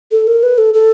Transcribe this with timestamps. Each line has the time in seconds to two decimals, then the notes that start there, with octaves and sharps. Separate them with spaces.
0.11 A4
0.27 A#4
0.43 B4
0.58 A4
0.74 A4